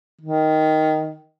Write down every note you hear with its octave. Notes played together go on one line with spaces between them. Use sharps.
D#3